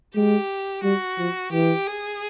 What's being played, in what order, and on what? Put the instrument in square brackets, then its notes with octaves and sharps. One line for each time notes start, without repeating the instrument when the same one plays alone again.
[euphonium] G#3 [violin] G4
[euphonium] G3 [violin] F#4
[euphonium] F3
[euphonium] E3 [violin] G4
[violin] G#4